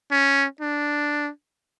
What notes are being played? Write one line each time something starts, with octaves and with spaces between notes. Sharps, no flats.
C#4
D4